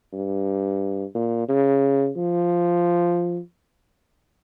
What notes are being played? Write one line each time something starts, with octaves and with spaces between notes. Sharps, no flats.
G2
A#2
C#3
F3